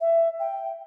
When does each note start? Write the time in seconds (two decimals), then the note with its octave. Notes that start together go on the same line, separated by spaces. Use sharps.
0.01 E5
0.39 G5